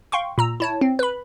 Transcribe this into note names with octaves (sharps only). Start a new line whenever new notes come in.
F5 G5 C6 C#6
A#2 A#5 E6
E4 C#5 A5
C4
B4 B5